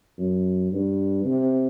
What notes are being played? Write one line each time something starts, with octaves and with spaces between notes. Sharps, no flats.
F#2
G2
C3